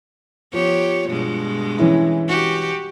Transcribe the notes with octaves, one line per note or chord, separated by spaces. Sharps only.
F3 B3 G4 C#5
G2 B2 G#3
E3 C#4 E4
F#4 G4